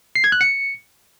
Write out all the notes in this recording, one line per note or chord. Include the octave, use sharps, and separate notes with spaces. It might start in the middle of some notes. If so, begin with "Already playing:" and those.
C7
G#6
F#6
C#7